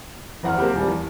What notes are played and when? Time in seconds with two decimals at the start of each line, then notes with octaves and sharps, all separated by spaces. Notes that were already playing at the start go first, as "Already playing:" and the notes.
0.43 F#1 E2 F#5 C6 F6
0.58 A#3 C4 G4
0.74 D#1 G3
0.87 E2